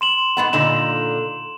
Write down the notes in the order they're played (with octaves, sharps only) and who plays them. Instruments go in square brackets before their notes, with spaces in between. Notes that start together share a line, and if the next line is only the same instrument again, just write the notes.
[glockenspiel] C6 E7 F#7
[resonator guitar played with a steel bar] G#2 B3 F#5
[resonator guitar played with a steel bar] A#2 D3 D#4 [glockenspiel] E7